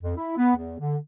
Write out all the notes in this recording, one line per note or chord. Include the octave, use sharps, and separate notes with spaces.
F2
E4
B3
E2
D3